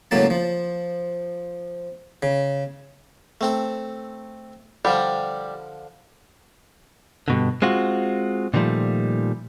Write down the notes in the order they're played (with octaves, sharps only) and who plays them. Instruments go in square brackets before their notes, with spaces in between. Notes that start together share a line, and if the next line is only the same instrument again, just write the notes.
[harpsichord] C#2 A2 F#3 A#3 A5
F3
C#3
A3 C4 A4
[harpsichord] D3 F3 [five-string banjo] G3
[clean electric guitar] G2 B2 D3
G#3 C4 F4 F#4
A#2 D3 D#3 F3 G3 A3